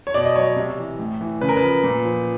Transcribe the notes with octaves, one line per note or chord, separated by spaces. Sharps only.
C#5
B2 D5
D#5
F#3 C#5
C3
E3
A2
E3
C#3 B4
A#4
B4
F3
A#2
F3